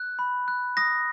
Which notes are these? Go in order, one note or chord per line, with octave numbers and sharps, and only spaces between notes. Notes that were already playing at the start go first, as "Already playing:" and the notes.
Already playing: F#6
B5
F#6
D#6 A#6